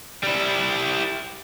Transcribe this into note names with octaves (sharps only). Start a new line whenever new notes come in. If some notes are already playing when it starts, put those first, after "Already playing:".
G3 E4